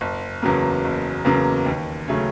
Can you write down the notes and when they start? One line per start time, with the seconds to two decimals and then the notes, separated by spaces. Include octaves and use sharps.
0.01 F#1
0.42 E2 C#3 F#3 A#3
0.84 F#1
1.25 E2 C#3 F#3 A#3
1.66 D#2
2.08 C#3 F#3 A3 C#4